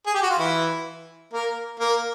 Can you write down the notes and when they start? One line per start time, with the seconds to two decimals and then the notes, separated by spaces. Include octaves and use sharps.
0.06 G#4
0.14 G4
0.23 F#4
0.30 F4
0.39 E3 E4
1.33 A#3 A#4
1.79 A#3 A#4